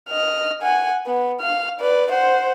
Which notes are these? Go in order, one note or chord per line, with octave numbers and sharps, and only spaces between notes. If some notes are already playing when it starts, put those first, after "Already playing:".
D#5 F6
F#5 G#5
B3
F5 F6
B4 D5
C5 F#5